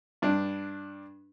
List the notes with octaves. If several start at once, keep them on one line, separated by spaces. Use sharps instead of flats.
G2 D4